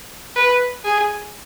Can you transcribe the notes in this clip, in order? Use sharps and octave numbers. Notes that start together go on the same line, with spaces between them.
B4
G#4